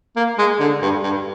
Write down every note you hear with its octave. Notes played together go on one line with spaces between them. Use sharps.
A#3
G#3
D3
G2
G2